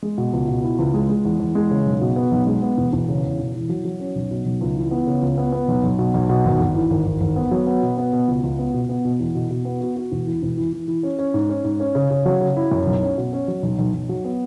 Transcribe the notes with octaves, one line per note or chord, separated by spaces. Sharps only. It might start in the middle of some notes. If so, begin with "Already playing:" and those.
G#3
B2
C#2
B2
E4
C#2
G#3
G#3
E2
E2
G#3
C#3
B1
B2
B3
B1
G#3
B3
E1
E1
C#3
E2
E1
E3
F#3
F#3
C#4
B1
B2
B1
C#2
E3
B3
C#3
C#2
B3
B3
B1
B1
B2
B1
B2
G#1
G#1
E3
G#1
G#1
G#1
B3
F#3
B3
B2
B3
B2
C#2
C#2
B3
B2
B3
B2
E2
B2
B2
B3
F#4
F#4
E1
E3
E1
E3
E3
E3
C#4
C#4
G#2
C#4
G#2
C#4
C#3
C#3
F#3
C#3
E4
F#2
B1
C#4
B2
C#4
F#3
B1
B1
B1
F#3
B3